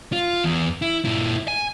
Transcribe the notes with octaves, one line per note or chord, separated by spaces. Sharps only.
F4
E2
E4
A#2 E4
G#5